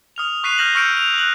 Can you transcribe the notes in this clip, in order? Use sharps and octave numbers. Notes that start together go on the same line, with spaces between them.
D#6 F6 F7
C#6 F#6 B6 C7 D#7 F7
F6 G6 A#6 E7 F#7
C#6 E6 F6 G6 C#7 D7
F7
F#6 F#7